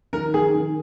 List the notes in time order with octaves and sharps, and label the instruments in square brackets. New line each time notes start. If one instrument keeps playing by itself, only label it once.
[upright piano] D#3 A#4
D#3 G#4
D#3